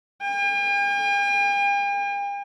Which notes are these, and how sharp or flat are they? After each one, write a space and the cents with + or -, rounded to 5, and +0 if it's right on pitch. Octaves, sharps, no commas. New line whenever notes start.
G5 +45